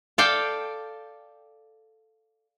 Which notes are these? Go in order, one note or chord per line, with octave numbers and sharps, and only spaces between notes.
A4 D5 F5 G5